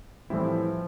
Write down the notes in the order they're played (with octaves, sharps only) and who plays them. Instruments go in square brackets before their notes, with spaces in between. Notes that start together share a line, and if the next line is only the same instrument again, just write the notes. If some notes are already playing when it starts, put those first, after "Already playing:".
[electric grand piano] A2 E3 G3 C4 E4 [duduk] F3